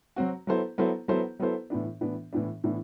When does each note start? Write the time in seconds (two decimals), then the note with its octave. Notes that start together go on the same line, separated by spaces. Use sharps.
0.16 F#3 C4 F#4
0.47 F#3 B3 E4 A4 C5
0.78 F#3 B3 E4 A4 C5
1.08 F#3 B3 E4 A4 C5
1.39 F#3 B3 E4 A4 C5
1.70 A2 E3 B3 D4
2.01 A2 E3 B3 D4
2.33 A2 E3 B3 D4
2.64 A2 E3 B3 D4